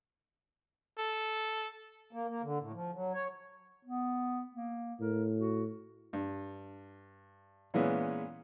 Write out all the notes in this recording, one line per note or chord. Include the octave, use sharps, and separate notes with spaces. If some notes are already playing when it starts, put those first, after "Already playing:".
A4
A#3
A#3
D3
A2
F3
F#3
C#5
B3
A#3
A2 A#4
F#4
G2
A#2 E3 G#3 B3 C#4